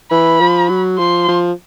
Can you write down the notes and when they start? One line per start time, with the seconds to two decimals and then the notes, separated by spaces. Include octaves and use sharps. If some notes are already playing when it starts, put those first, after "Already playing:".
0.11 E3 B5
0.41 F3
0.70 F#3
0.98 F3 C6
1.28 F3